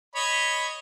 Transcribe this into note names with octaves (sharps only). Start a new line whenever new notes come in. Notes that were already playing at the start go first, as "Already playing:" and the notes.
C#5 D#5 B5